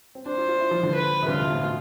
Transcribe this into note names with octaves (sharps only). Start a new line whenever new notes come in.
C4
D4 C5
F4
F4
E4
F3
D3
B4
C3
D3 F4
C3
B2
A2
B2